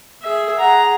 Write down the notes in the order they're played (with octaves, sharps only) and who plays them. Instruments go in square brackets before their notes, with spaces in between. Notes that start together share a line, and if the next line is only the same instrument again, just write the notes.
[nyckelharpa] G#4 E5
[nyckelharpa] G#4 A#5 [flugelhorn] F#5